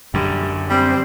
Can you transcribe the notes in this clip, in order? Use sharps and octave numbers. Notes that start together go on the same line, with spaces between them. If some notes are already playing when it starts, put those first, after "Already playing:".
F#2 D3 G3
G3 C4 C5